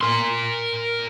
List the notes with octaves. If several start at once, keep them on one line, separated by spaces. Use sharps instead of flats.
A#4 C6